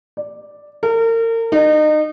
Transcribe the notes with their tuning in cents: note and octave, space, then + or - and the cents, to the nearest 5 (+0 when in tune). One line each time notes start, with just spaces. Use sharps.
D5 +0
A#4 -35
D#4 -30